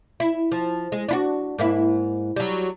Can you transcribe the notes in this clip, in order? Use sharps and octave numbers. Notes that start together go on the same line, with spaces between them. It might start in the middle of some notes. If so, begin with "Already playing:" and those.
E4
F3
G#3
D4 E4 F#4
G#2 A#3 E4
F#3 G3